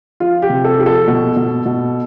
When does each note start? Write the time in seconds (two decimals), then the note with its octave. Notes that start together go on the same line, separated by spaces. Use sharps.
0.20 F3 F4
0.42 G4
0.50 C3
0.65 A4
0.79 F3 G4
0.86 A4
1.08 B2
1.36 B2
1.66 B2